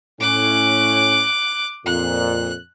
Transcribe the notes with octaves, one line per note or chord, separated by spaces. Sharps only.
A2 C#4 D6 F#6
F2 A#2 F#6